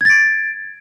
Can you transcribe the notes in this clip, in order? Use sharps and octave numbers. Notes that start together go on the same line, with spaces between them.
G#6 A6 D7